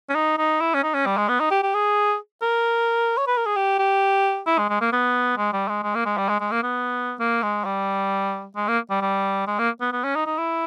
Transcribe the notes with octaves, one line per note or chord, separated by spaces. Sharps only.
C#4
D#4
D#4
E4
C#4
D#4
C#4
G3
G#3
B3
D#4
G4
G4
G#4
A#4
C#5
B4
A#4
G#4
G4
G4
E4
G#3
G#3
A#3
B3
G#3
G3
G#3
G#3
A#3
G#3
G3
G#3
G#3
A#3
B3
A#3
G#3
G3
G#3
A#3
G3
G3
G#3
A#3
B3
B3
C#4
D#4
D#4
E4